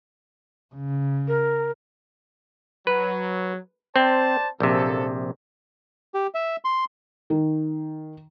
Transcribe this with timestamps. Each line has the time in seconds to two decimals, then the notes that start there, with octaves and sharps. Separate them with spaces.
0.75 C#3
1.28 A#4
2.87 F#3 B4
3.96 C4 C5 D5 A5
4.60 A#1 F#2 C3 A#3 A4
6.14 G4
6.35 E5
6.65 C6
7.30 D#3